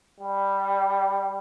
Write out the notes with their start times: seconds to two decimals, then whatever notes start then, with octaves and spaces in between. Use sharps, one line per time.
0.20 G3